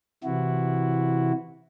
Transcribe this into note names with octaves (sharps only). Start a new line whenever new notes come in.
C3 E3 E4 F#4